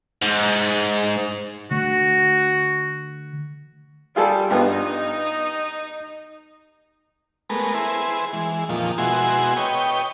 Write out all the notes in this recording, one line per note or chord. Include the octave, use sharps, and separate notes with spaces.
G#2
D3 A3 F#4
G3 F4 G#4 A4
G2 B3 D#4 F4
G#3 A3 B3 A#4 B4
E4 G#4 B4 C5
E3 G#3
F2 A#2 D#3 F3
B2 G#3 E4 F#4 G#5 C6
B4 C#5 D#5 G5